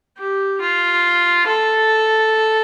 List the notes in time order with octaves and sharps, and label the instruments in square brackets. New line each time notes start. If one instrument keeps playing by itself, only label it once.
[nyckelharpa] G4
F4
A4